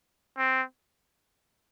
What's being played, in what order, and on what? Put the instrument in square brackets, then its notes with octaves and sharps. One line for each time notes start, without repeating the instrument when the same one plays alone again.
[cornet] C4